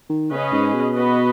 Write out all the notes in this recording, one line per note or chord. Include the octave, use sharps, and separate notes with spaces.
D#3
C#3 C#4 G#4 B4 D#5
G#2
B2
B3 F#4 B4 D#5